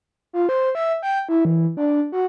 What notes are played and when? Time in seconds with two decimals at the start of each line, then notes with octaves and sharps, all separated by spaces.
0.33 F4
0.49 C5
0.75 E5
1.03 G5
1.29 E4
1.45 E3
1.77 D4
2.12 F#4